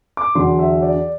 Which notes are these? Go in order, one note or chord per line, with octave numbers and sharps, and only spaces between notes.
D6
E2 D3 F#3 C6
E5
D5